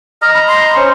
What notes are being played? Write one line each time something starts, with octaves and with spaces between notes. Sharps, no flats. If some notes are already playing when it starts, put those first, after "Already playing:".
D#5 A#5 F6
B5
C6
C#4 C5 C#6